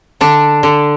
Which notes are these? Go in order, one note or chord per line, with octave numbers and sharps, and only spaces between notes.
D3 D4
D3